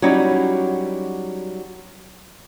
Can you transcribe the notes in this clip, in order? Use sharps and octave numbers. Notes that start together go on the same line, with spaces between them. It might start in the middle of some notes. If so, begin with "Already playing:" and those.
F#3 G3 C#4 D#4 E4 F#4